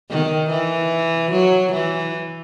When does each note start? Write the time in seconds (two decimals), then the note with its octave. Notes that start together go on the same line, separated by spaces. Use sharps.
0.10 D#3
0.50 E3
1.32 F#3
1.73 E3